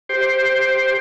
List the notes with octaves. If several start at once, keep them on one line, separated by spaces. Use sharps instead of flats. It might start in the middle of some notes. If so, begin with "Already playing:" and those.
G4 C5